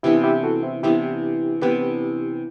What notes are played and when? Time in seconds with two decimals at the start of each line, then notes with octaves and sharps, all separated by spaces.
0.03 C3 E3 B3 D4 E4 G4
0.24 E4 G4
0.43 F#4 A4
0.63 C4 E4
0.83 C3 E3 B3 D4 E4 G4
1.61 C3 E3 B3 D4 G4 B4